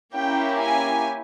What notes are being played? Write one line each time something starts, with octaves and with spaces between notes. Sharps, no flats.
A#3 C#4 E4 G4 G5
G#5